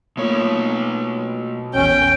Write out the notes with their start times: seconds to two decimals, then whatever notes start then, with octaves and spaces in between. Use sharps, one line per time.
0.17 B2 A3 A#3 F4 C#5
1.75 A#1 E2 C#4 G5